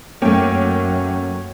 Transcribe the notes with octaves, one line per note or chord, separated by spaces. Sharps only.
F#2 A3 A#3 C#4 G5